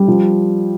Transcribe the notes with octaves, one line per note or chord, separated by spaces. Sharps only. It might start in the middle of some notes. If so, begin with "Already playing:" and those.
Already playing: G3
F3